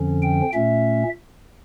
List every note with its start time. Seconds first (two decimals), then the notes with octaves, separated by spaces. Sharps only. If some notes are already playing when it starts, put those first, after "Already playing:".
Already playing: F2 D3 F3 C#4
0.22 G5
0.53 A#2 A3 C#4 E5